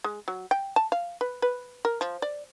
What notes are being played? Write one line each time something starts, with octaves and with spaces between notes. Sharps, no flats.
G#3
F#3
G5
A5
F5
B4
B4
A#4
F3
D5